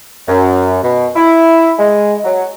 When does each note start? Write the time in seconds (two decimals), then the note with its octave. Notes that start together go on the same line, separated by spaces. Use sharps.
0.28 F#2
0.83 B2
1.16 E4
1.79 G#3
2.25 F#3